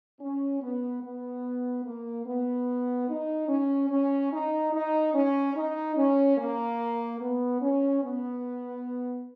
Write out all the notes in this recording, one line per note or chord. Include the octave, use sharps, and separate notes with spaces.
C#4
B3
B3
A#3
B3
D#4
C#4
C#4
D#4
D#4
C#4
D#4
C#4
A#3
B3
C#4
B3